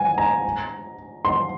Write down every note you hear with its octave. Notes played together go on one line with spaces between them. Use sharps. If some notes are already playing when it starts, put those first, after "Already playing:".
Already playing: G#5
A#5
C6